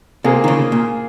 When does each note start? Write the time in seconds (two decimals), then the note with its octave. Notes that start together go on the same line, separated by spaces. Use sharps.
0.24 C3 A#3 F4 G#4 C5
0.44 D#3
0.48 C#3
0.72 A#2